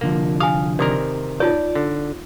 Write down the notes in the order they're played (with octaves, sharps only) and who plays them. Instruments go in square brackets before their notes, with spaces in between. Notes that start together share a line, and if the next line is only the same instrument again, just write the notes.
[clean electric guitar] C2 D3 F3 [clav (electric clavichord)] A#3
[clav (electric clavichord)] F5 [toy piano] G#5 D#6
[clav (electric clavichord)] C3 D#3 A#4 [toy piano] D5 D#6
[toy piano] D#4 F4 C#5 [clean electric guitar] D5
[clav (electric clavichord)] D3